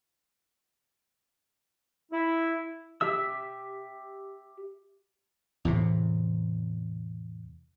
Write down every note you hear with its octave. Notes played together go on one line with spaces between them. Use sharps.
E4
G4 E5 E6
E2 A2 C3